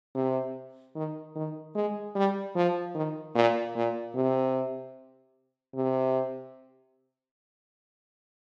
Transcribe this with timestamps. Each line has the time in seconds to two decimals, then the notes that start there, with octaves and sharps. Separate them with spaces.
0.15 C3
0.95 D#3
1.35 D#3
1.75 G#3
2.15 G3
2.55 F3
2.95 D#3
3.35 A#2
3.75 A#2
4.15 C3
5.75 C3